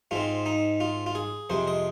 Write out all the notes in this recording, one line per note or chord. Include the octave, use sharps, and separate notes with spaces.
G#2 G#3 C4 F4
D#4
F4
F4
G#4
F2 C3 G#3 C5
D#5